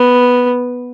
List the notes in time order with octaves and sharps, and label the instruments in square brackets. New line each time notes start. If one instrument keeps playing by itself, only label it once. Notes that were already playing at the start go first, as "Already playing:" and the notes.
Already playing: [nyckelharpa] B3